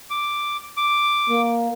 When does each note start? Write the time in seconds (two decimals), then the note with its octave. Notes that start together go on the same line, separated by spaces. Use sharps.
0.10 D6
0.77 D6
1.30 A#3